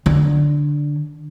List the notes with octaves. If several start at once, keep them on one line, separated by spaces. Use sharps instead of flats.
D3